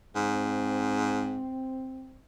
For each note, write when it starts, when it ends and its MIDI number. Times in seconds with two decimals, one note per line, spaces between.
0.16 1.50 44
0.16 2.19 60